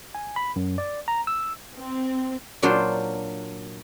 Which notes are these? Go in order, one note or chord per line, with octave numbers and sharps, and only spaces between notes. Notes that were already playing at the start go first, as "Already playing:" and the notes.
G#5
B5
F#2
D5
A#5
E6
C4
A#2 F#3 D4 F4 C5